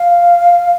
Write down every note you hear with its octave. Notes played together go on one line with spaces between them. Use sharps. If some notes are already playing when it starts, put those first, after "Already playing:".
Already playing: F5